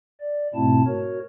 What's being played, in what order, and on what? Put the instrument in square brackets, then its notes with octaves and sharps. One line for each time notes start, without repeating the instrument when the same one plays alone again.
[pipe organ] D5
G#2 B2 A3 C4 E4 A5
F#4 A#4 C#5